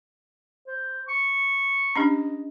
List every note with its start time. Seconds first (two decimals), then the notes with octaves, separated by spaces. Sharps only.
0.67 C5
1.08 C#6
1.96 C#4 D4 G4 D#5